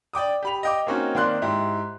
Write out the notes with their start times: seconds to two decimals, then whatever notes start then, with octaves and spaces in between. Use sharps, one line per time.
0.13 D5 G5 D6 D#6
0.43 G4 B5 F7
0.63 D#5 G5 D6
0.87 A#3 C4 C#4 D#4 F#4
1.15 D#3 A#3 C4 D5 C6 F#6
1.42 G#2 E4 G4